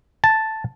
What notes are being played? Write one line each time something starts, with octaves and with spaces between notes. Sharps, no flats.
A5